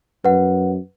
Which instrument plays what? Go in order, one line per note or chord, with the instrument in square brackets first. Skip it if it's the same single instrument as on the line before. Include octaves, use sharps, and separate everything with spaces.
[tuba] F#2 [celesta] B4 F#5